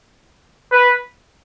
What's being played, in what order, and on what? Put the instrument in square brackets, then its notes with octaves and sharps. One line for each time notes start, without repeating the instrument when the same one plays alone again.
[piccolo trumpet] B4